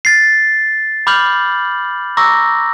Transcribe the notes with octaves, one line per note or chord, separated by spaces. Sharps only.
A6 C7
B5 D6 F6 G6 F#7
A#5 C#6 D6 E6 A#6